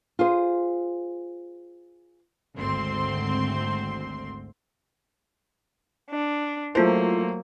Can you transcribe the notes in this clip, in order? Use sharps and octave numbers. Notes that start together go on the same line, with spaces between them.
F4 G#4 C5
G#1 D2 C4 C6
D4
F#3 A3 A#3 E4 F4 C5